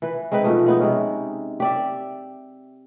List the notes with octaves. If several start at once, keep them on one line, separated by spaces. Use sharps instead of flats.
E3 B4
G#3 C4 D#4 B4
B2 F3 A3 D#5
G#3 B3 D#4
C3 G#3 C#4
G4 D5 E5